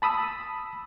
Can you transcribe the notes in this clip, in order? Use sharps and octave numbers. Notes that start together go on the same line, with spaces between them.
A5 B5 D#6 E6